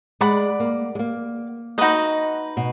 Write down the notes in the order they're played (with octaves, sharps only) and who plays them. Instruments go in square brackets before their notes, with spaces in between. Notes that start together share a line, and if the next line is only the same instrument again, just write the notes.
[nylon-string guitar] G#3 [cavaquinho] D5 F#5 B5
[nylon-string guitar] A#3
G#3
A#3
[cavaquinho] D#4 F#4 B4 D#5
[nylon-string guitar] B2